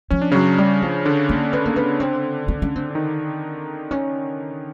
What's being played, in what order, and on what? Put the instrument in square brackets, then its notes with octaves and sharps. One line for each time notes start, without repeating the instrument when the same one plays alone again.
[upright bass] F3 [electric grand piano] C#4
[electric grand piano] D4
[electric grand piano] C#3 C#4 [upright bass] F#3
[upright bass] G3
F3
[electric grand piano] D3 D4
[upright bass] A#3
B3
A#3
B3
C4
C4
C#4
C4
[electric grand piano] D4
D#3 D#4
[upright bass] C#4